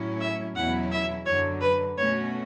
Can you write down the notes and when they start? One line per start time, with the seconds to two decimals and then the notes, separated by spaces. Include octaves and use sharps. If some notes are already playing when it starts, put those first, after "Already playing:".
Already playing: A2 F#3 C#4 E4
0.21 E5
0.55 E2 B2 F#3 C#4 E4 F#5
0.92 E5
1.26 F#2 D3 F#3 C#5
1.61 B4
1.97 B2 A3 C#4 F#4 C#5